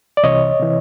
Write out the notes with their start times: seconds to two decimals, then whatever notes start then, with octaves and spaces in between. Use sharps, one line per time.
0.17 D5
0.23 C2 C3 E3 C#5 D#5
0.59 C3 E3